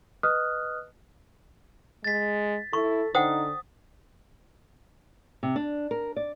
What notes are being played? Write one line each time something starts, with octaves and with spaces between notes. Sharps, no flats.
B4 D#5 D#6 F6 F#6
G#3 A6 B6
E4 A4 C#6
D3 D#4 C5 F#5 G5 D#6
C3
D4
A#4
D5